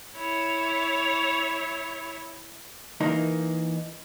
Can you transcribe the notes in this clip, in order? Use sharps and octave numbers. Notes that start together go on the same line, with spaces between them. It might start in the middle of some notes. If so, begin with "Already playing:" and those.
E4 C#5
E3 A#3 D#4 A#4